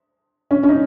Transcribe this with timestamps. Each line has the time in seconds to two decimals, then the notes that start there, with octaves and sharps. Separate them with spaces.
0.51 C#4
0.63 C#4
0.69 D#4